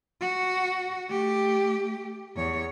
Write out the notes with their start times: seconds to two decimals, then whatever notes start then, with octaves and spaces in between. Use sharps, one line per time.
0.21 F#4
1.10 A3 G4
2.36 E2 C#5